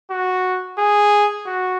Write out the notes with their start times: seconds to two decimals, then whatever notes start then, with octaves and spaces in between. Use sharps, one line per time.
0.11 F#4
0.79 G#4
1.47 F#4